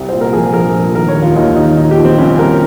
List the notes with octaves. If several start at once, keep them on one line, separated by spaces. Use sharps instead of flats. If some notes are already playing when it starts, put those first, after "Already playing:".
Already playing: C2
A#2 C5
A#4
F3 G#4
A#1 A#4
A#1
D#3 A#4
C#5
D#2
F4
D#2 D#4
D#3 D#4
A#2 D#4
G4
F3
C4
C2 C#4
C2 A#4